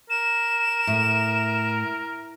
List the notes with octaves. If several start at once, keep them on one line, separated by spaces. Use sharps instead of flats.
A#4 E7
A2